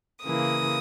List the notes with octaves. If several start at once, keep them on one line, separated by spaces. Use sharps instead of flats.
C#3 E3 A#3 D#6